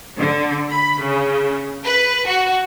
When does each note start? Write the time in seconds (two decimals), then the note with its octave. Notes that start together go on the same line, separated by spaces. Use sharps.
0.17 D3
0.72 B5
1.03 C#3
1.86 B4
2.28 F#4